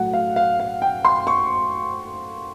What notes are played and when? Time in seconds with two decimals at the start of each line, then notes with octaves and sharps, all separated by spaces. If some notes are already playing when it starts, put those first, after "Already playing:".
Already playing: A2 F#3 A3 F#5
0.13 F5
0.36 F5
0.60 F5
0.82 G5
1.05 C6
1.27 C#6